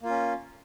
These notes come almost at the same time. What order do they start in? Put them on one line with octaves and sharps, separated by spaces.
A#3 F4 C#4